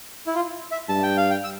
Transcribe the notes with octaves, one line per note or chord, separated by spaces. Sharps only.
E4
F4
E5
G2 A5
G5
F5
G5
E6